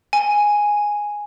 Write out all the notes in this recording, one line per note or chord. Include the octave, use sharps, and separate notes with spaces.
G#5